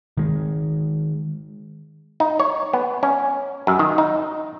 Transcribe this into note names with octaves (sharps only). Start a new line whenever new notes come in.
D#3 G#3
D#4
C#5
B3
C#4
F#2
D#3
D#4